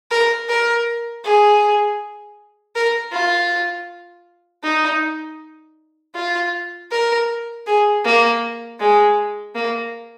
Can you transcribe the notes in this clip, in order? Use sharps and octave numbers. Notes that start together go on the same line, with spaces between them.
A#4
A#4
G#4
A#4
F4
D#4
F4
A#4
G#4
A#3
G#3
A#3